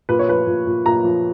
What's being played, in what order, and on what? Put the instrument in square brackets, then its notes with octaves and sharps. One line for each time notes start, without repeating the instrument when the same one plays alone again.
[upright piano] A#2 B4
C#5
F3 B4
A#2
A#2
A#2 A#5
F3